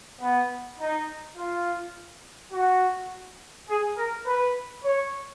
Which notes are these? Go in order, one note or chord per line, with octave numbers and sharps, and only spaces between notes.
B3
D#4
F4
F#4
G#4
A#4
B4
C#5